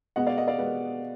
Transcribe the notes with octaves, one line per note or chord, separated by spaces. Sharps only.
B2 G#3 B3 D#5 F#5
D5 F5
D#5 F#5
D5 F5
B2 G#3 B3